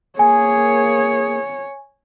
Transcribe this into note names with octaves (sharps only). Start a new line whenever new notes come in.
A#3 G#4 C#5 G#5